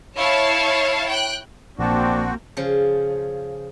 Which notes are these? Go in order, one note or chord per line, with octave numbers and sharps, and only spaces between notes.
E4 C#5 F5 A5
G5 F#6
A#1 A#3 C4 D4 F#4 A5
C#3 F3